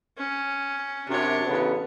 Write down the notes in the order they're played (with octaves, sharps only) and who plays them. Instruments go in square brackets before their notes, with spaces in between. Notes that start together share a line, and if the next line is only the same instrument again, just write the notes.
[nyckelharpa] C#4
[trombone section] F#2 C3 [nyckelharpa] D4 C#5
[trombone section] A1 C#3 B3